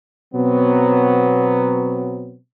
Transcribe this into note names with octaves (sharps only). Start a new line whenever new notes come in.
B2 F#3 B3 C4